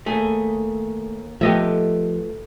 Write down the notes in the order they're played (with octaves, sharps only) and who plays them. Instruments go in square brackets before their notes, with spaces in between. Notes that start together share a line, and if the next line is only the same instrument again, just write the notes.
[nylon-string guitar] D#2 G#4 [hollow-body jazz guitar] A3
[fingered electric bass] F3 [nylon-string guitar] A3 B3 [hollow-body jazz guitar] G4 D#5 E5